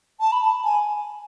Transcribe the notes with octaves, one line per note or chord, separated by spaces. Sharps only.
A5
B5
A5
G#5